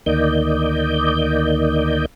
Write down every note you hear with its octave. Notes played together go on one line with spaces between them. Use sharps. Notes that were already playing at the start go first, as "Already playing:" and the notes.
D2 D#3 A#3 D5 D#5 G6